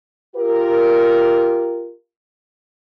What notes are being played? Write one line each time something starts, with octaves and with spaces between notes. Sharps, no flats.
F4 G4 A#4